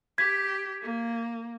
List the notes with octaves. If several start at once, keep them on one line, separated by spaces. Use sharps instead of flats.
G4 G#6 B6
A#3